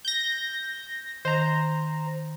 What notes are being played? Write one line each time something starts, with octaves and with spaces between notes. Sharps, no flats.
G6 A#6
D#3 C5 A#5